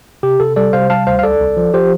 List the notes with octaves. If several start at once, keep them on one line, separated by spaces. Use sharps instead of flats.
C3 G4
C3 A4
G3 A4 D5
C3 C5 F5
G3 F5 A5
D2 C5 F5
F5
C2 A4 D5
C2
F3
F3 G4 C5